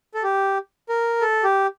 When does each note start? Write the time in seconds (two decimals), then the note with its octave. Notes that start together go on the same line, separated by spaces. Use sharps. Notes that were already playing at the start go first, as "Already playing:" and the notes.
0.14 A4
0.23 G4
0.89 A#4
1.21 A4
1.44 G4